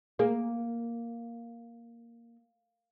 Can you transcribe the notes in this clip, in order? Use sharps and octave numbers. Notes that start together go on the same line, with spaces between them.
A#3 G#4 A#4